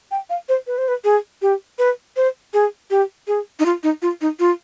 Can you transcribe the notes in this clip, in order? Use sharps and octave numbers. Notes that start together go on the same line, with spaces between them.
G5
F5
C5
B4
C5
B4
G#4
G4
B4
C5
G#4
G4
G#4
D#4
F4
D#4
F4
D#4
F4